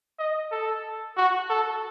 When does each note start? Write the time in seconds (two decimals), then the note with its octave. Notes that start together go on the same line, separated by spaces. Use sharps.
0.19 D#5
0.52 A4
1.17 F#4
1.50 A4